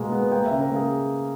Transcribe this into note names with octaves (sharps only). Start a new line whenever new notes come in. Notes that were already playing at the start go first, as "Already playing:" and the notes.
Already playing: B2 G#3 A#3 G#5
B3
A#3 G5
C#3 E5
A#4
A#3 G#4